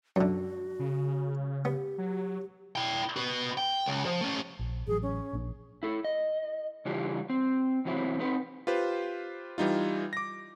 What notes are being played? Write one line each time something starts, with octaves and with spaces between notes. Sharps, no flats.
F#2 D3 F#4
C#3
B3 G4
F#3
E4 G5
F#4 B4
G5
C#2
F3
A3 C#4
A#1
A1 F#3 G#4
C#4
A#1 A#3 D4
E4 A4
D#5
C#3 E3 G3 D4 F4
C4
E2 C3 F#3 C4 E4
C4 D#4 B4
F4 G4 B4 C5
E3 G3 D#4 F4
D6 A#6